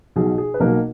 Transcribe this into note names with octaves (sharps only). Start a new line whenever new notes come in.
B1 B2 G#4
G#4
B4
B1 B2 A#3 A#4